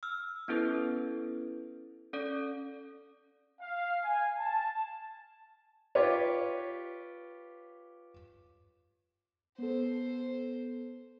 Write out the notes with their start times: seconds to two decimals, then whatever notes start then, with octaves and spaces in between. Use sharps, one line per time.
0.03 E6 F6
0.48 B3 C#4 E4 A4 B4
2.13 C#4 A4 D5
3.60 F5
4.04 G#5
4.39 A5
5.95 F4 G4 B4 C#5
9.58 B3 A4 C5